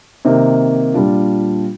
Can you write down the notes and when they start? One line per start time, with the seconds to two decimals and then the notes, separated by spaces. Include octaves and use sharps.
0.25 C3 D#3 A#3
0.94 A#2 G3 D4 F4